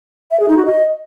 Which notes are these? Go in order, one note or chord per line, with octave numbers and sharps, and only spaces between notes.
E5
G#4
D#4
F#4
D#5